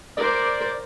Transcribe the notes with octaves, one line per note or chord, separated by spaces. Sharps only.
A#4 C5 D5